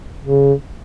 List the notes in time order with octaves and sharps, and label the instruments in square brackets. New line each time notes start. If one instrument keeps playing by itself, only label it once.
[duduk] C#3